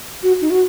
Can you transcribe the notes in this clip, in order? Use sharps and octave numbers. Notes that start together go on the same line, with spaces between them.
F#4
D#4
F#4